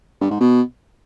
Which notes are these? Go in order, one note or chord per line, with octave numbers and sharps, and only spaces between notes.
G2
G#2
B2